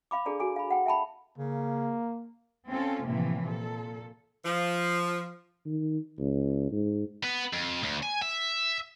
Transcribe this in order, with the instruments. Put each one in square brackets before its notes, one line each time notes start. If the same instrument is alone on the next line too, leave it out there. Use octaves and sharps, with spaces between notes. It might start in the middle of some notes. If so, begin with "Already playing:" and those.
[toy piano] F5 B5 D6
D4 G#4 A4 D5 A#5
F#4 A4 G#5 D6
F5 B5
F#5 G5
E5 G5 A5 B5
[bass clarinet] C#3 [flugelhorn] A#3
[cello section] C4 C#4 F4 A4
A2 C3 E3 F3 A#3
A#2 A4
[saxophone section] F3
[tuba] D#3
C#2
G#2
[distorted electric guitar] B3
F2
D2
G#5
E5